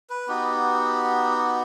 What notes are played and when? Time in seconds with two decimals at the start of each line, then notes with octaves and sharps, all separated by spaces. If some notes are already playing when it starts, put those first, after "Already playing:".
0.10 B4
0.28 B3 D#4 F#4 G4